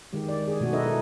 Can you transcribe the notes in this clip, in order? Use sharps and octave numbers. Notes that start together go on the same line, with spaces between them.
D#3 G#3 G4
D5
G#4
B2 A3 F#4 A4
D#4 A4 B4 D#5 E5
E4